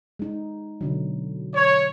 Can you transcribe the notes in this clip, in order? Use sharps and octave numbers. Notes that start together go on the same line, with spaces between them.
G#3 D#4
B2 D3 F#3
C#5